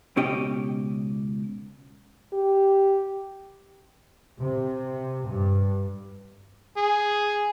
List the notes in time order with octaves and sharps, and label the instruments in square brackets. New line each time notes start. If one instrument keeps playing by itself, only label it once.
[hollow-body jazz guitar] C#2 B2 C#4 G4 D#5 G5
[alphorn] G4
[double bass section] C3
G2
[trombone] G#4